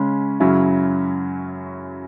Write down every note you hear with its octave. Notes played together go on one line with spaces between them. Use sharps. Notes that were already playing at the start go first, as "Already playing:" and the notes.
Already playing: C#3 G#3 C#4
F#2 C#3 F#3 C#4 E4